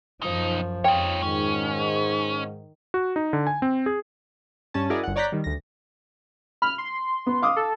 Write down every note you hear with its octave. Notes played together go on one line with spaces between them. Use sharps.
F#2 B2 F3 D#4
F2 D#4 F4 C#5 G5
G#2 D#3 C#4
F#4
D#4
D3
G#5
C4
G#4
G2 C#4 A5
E4 F#4 G#4 A#4 D5 D#5
G1 F#5
C#5 D5 A#5 F#6 G6 B6
D#3 G3
D2 A#6
B5 F6
C6
B3
F5 D6 D#6
A4